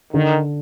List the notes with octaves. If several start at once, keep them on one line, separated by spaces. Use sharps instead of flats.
D3 D#3